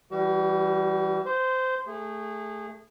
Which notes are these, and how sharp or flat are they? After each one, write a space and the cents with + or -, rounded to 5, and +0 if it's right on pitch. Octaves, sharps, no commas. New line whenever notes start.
E3 +15 G3 +0 F#4 +45
C5 -15 C6 +0
A3 +0 G#4 -25